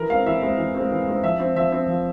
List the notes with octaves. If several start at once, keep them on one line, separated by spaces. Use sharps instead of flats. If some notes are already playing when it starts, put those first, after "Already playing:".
Already playing: E3 A#4
G#3 C4 F5
E3 E5
G#3 C4 E5
E3
G#3 C4
E3
G#3 C4
F3 E5
C4
F3 E5
C4
F3